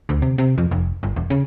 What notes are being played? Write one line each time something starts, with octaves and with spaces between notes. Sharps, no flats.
D2
C3
C3
F2
F1
G1
E1
C#3